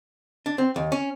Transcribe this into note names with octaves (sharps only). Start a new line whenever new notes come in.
D4
C4
D#2
C#4